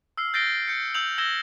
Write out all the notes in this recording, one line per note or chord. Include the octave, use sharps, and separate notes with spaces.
E6 F6 C7
G6 A6 A#6 C7 D7 G7
G6 C#7
E6 G6 F7 F#7
E6 G#6 A#6 E7 G7